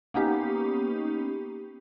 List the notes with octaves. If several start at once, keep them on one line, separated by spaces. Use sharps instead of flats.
A#3 B3 C#4 D#4 G4